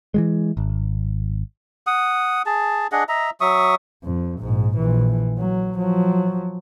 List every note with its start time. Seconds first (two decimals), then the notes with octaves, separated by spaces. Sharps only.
0.14 E3 F#3 G#3
0.57 G#1
1.87 F#5 D#6
2.46 G#4 A5
2.92 D4 G#4 D#5 F#5
3.09 D#5 E5 A#5
3.41 F#3 E5 C#6 D#6
4.03 F2
4.40 A#1 G#2
4.77 A#1 E3
5.38 F#3
5.78 F3 F#3